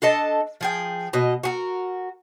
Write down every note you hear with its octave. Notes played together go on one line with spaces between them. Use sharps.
D4 A4 D#5 A5
F3 G#4 G5
B2 D#5
F#4 G#4 A#4